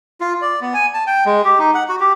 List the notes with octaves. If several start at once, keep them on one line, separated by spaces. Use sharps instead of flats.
F4
D5
B3
G#5
A5
G5
G#3
G4
D#4
F#5
F#4
G4